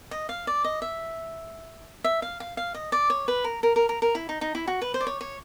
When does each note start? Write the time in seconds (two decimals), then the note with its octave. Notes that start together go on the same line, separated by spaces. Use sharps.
0.11 D#5
0.29 F5
0.47 D5
0.64 D#5
0.82 E5
2.04 E5
2.22 F5
2.40 F5
2.57 F5
2.74 D#5
2.92 D5
3.10 C#5
3.28 B4
3.44 A#4
3.63 A#4
3.76 A#4
3.89 A#4
4.02 A#4
4.15 E4
4.29 D#4
4.41 D#4
4.55 E4
4.68 F#4
4.81 B4
4.94 C5
5.00 D5
5.07 C#5
5.21 C#5